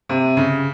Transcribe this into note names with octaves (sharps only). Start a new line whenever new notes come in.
C3
C#3